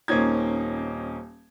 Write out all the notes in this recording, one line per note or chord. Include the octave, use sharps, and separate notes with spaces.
D#1 A#3 C4 C#4 D#4 G#6